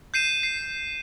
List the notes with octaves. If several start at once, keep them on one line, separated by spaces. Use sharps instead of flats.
G6 C7 D#7 E7
C7